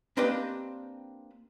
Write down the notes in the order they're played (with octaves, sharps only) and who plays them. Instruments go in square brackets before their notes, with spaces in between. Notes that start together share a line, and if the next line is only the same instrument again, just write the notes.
[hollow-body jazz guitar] A#3 C4 D4 G4 B4 D#5